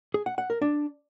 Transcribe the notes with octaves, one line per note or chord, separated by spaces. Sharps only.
G#4
F#5
F#5
A#4
D4